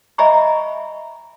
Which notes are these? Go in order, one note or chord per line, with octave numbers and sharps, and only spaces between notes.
D#5 E5 G#5 A#5 B5 C#6